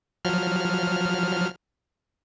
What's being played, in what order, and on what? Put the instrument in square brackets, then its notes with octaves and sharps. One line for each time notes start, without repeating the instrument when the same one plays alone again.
[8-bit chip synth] F3 F#3 F6